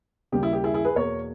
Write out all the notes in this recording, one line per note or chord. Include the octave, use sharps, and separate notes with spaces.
D#2 C#3 G3 A#3 G4
E4
G4
E4 G#4
E4 G#4
G#4 B4
E2 B2 A#3 A#4 C#5